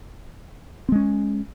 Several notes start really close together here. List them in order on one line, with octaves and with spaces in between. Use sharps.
C4 G#3 C#4